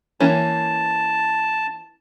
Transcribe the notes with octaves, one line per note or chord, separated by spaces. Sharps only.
E3 A#3 C#4 A5